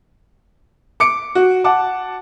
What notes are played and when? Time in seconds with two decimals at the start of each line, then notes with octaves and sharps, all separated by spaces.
1.00 D6 C#7 D7
1.35 F#4
1.64 F#5 A5 D6